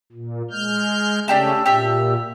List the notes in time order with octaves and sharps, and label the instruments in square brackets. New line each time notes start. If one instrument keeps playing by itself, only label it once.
[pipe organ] A#2
G#3 F6 G6
[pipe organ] C#3 A3 C#4 [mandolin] D4 G4 E5
[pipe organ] A#2 [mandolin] G4 E5